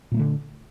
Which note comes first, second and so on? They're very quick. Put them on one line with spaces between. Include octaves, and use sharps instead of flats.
A#2 A#3 A3 D3